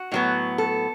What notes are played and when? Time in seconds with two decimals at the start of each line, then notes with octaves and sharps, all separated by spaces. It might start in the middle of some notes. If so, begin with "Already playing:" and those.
Already playing: F#4
0.12 A2 F#3 B3
0.58 A4